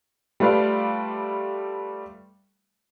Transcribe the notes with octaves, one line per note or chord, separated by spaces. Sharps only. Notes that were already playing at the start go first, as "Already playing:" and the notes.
G3 A3 F4 B4 D5 F5